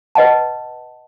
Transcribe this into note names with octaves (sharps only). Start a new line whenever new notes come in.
B4 D#5 F#5 A5